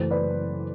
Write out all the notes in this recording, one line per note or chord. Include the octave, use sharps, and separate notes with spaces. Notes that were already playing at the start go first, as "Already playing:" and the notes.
Already playing: F#1 F#2 E3 A3 C5
B4 D5